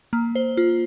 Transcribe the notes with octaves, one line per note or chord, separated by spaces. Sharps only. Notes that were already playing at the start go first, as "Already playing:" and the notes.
A#3
C5
F4